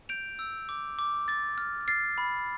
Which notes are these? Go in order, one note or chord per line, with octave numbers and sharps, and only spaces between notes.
G6 D7 F7
E6
D6
D6
D6 A6
F6
F6 A6 C7
B5